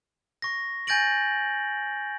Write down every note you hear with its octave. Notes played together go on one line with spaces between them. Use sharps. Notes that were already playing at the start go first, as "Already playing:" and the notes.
C#6 A#6
G#5 G6 A6 A#6 D7 F#7